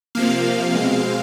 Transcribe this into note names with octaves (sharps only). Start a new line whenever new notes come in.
C3 F3 A#3 F5
B2 G#3 C4